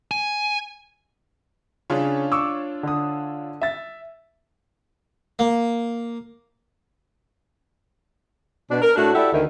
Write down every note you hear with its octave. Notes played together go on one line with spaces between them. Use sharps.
G#5
C#3 C#4 D4 F4 C#5
C#6 D6 E6
D3 D#6
E5 A6
A#3
B2 D4
A#4
A2 A3 D4 E4 F#4
E4 F#4 G4 A4 D5 E5
D2 D#3